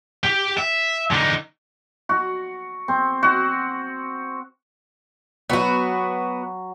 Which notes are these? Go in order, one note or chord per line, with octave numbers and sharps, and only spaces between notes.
G4 G5
E5
D3 D#4
F#4
C4
F#4
F#3 B3 F#4